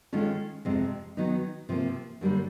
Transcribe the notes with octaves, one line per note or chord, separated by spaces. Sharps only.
D#3 G#3 C#4 F4 A4
F2 C3 F3 G#3
D#3 F#3 B3 D#4
C3 F3 A#3
F#2 D3 G3 A#3